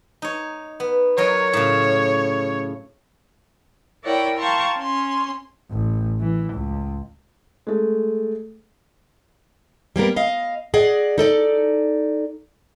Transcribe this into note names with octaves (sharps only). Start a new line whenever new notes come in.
D#4 C#5
B3
F#3 A#4 C#5 D#5
A2 C#3
E4 A#4 C#5 D5 F#5 G5
F5 G5 A5 A#5 C6 C#6
C#4 C6
A1
E3
C#2
G#3 A3
G3 A#3 B3 A#4
D#5 F5
G#4 D5 D#5 F#5
D#4 A4 D5